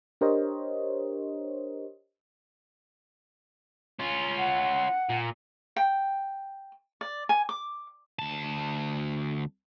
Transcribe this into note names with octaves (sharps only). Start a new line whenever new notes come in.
D4 G4 A#4 C5 C#5 D#5
C#4 F4
F#5
A#2
G5
D5
G#5
D6
D2 A5